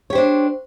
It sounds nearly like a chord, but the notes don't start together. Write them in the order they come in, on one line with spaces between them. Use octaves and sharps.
C#5 G4 C5 D4